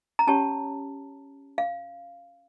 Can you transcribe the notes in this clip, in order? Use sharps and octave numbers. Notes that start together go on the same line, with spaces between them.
A#5
C#4 G4 C#5 A5
F5